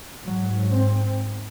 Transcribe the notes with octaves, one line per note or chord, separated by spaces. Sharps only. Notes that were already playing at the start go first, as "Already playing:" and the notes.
G#2 F#3
C4